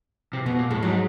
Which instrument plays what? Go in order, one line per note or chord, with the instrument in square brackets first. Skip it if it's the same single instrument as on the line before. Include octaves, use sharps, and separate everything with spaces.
[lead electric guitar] C3
[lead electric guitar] B2 [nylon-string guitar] B3
[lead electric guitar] A#2
[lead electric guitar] A2 [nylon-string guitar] G#3
[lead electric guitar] G#2 [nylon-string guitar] F#3